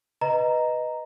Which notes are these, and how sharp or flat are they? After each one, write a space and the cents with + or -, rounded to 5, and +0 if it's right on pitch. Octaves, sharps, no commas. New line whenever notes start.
B4 +0 D#5 +0 A#5 +0